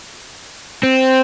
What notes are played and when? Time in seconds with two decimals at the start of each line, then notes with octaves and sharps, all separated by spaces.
0.83 C4